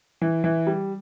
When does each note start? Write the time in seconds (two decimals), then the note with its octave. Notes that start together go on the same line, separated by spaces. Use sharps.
0.22 E3
0.44 E3
0.67 G3